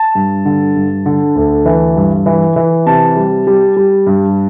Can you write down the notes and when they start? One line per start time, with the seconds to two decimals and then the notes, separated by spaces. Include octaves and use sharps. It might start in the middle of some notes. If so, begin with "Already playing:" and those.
Already playing: A5
0.15 G2
0.45 D3
0.76 G2
1.06 D3
1.36 D2
1.66 E3
1.97 G2
2.26 E3
2.56 E3
2.86 C3 A5
3.16 G3
3.47 G3
3.77 G3
4.07 G2